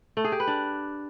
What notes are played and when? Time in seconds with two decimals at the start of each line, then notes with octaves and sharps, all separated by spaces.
0.17 A3
0.24 G#4
0.32 G4
0.40 B4
0.47 D4